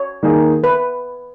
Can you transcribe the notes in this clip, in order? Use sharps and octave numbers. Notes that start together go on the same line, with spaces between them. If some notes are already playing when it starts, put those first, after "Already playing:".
Already playing: C#5
D#3 A#3 D#4 G#4
B4